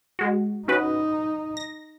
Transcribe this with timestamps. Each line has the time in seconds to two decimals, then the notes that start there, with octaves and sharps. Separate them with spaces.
0.19 G#3 F#4
0.68 C#4 D#4 F#4 B4
1.57 A#6